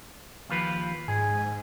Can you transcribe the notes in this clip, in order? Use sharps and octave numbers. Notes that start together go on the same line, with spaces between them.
D#2 F3 B4
G#2 G#4